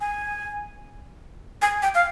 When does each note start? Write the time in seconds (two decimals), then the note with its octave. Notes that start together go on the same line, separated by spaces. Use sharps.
0.01 G#5
1.62 G#5
1.82 G5
1.95 F5